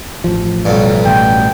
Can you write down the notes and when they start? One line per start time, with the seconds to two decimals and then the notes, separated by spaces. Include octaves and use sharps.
0.24 A1 F3
0.65 B1 G2
1.05 A1 G5